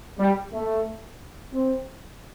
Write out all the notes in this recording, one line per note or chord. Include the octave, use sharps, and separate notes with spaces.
G3
A3
C4